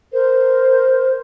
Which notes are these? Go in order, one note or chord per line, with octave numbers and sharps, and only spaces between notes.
A#4 C5